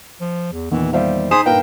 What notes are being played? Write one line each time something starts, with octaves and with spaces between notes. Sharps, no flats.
F3
E2
E2 A#2 D#3 E3
G3 C5 E5 F5
D#4 G#4 C5 D#6 B6 C7 E7
G2 A#2 A#4 B4 F5 G5